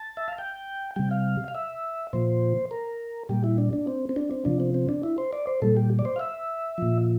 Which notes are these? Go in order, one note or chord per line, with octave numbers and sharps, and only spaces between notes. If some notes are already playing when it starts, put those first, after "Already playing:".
Already playing: A5
E5
F5
G5
C3 G3 G5
F5
F5
E5
A#2 F3 C5
A#4
A#2 G3 G4
E4
D4
D4
C4
C4
D4
C4
C3 F3 D4
C4
C4
D4
E4
C5
D5
C5
A#2 G3 A4
G4
D5
C5
F5
E5
A#2 F3